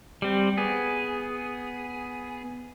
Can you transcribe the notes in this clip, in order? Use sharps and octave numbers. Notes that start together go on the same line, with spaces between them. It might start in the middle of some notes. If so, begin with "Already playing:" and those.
G3 C4
B3 G#4